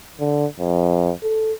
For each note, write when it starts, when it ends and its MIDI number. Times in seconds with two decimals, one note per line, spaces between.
0.20 0.46 50
0.59 1.12 41
1.23 1.53 69